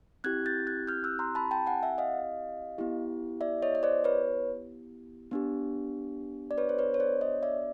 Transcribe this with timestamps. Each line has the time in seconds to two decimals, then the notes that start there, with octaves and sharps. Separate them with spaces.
0.24 C4 E4 G4 F#6 G#6
0.46 G6 A6
0.67 F#6 G#6
0.87 F6 G6
1.04 E6 F#6
1.19 A#5 C6
1.35 A5 B5
1.51 G5 A5
1.66 F#5 G#5
1.83 E5 F#5
1.98 D#5 F5
2.78 B3 E4 G4
3.41 D5 E5
3.62 C#5 D#5
3.75 D#5
3.83 C5 D5
4.04 B4 C#5
5.31 B3 D4 G4
6.51 D5
6.58 B4 C#5
6.69 C5
6.78 B4 C#5
6.94 C#5
7.00 C5 D5
7.21 C#5 D#5
7.43 D5 E5